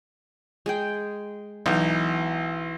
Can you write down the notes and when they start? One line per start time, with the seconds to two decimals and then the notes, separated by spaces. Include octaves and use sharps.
0.66 G#3 G#4 G5
1.66 B1 E3 D#4